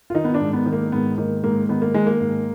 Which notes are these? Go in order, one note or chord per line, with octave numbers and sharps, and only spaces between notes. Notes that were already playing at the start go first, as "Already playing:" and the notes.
F4
D#3 D#4
B3
D4
G#2
B3
D#3
A#3
G#2 B3
D#3 A#3
G#2 A#3
D#3 B3
A#3
D#3 G#3
A#3
G#2